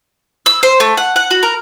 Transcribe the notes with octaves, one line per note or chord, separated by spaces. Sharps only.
E6
C5
A3
F#5
F#5
F#4
A#4